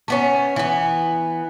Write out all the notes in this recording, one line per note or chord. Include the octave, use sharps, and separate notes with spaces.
A3 B3 C#4
E3 B3